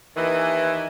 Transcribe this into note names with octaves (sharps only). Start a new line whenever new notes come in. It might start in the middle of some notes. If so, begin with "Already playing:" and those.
D#2 D#3 E3